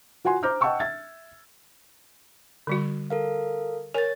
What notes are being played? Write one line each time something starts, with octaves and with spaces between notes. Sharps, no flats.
F4 F#4 F#5 G#5 C6
C5 A#5 D6 F6 G6
D#5 F#5 G5 A5 C#6 E6
E5 G#6 A6
D3 G3 F#4
A4 A#4 F5
A#4 C#5 G#5 A6